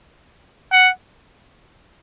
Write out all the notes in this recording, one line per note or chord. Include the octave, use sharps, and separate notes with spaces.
F#5